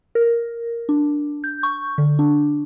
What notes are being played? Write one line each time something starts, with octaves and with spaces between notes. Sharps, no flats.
A#4
D4
G6
C#6
D3
D4